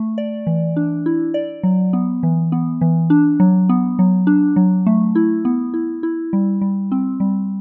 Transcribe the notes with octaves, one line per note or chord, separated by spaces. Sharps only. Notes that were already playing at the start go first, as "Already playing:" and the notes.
Already playing: A3
D5
E3
D4
E4
D5
F#3
B3
E3
B3
E3
D4
F#3
B3
F#3
D4
F#3
A3
E4
B3
E4
E4
G3
G3
C4
G3